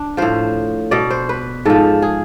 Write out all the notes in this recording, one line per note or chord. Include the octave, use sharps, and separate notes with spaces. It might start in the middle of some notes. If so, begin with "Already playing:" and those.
Already playing: D4
A2 F3 C5
B2 D5
C5
B4
G#2 F3 A4
G#4